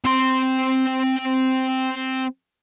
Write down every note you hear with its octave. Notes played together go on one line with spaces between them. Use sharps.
C4 C6